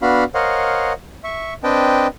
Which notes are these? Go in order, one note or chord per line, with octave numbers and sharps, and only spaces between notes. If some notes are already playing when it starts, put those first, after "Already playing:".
B3 D4 F#4 F5 B5
A#4 C5 C#5 D#5 F5 F#5
E5 C#6
C4 D4 B4 D#5 G5 A5